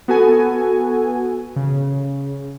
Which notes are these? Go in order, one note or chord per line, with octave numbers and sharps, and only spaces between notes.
B3 F#4 A4 G#5
C#3